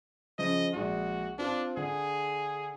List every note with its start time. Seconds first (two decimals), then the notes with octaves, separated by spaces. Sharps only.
0.39 C#3 F3 D#5
0.74 A#1 G#3 F#4
1.39 C4 D4 F4
1.77 D3 G#4